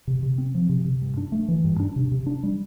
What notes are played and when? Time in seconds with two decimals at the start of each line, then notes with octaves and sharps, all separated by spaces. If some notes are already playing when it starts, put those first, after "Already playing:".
0.07 C3
0.23 C3
0.38 C4
0.55 F3
0.69 C3
0.85 C3
1.01 G2
1.17 D4
1.32 A3
1.48 E3
1.64 G2
1.80 D4
1.96 C3
2.12 C3
2.26 D4
2.43 G3